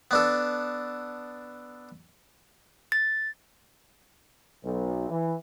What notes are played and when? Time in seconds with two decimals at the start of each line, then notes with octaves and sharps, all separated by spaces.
0.11 B3 D4 A4
2.92 A6
4.64 B1
5.09 E3